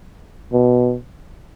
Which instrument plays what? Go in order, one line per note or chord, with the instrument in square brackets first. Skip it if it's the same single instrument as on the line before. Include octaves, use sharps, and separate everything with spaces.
[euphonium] B2